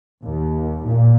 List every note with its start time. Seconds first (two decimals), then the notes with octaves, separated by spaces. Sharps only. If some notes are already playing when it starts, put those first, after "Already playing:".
0.23 D#2
0.84 A#2